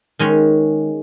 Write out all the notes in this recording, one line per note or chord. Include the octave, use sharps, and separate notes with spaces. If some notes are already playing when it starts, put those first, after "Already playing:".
D#3 G#3 C#4